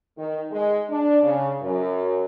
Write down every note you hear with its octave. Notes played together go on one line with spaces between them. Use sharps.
D#3
G#3
D4
C#3
F#2